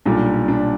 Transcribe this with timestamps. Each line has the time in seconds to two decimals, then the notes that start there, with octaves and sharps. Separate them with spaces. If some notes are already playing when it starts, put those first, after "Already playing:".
0.05 B1 A#2 G3 D4
0.48 D4